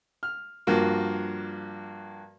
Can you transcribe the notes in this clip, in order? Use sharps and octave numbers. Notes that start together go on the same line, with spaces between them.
F6
G2 F3 A#3 F#4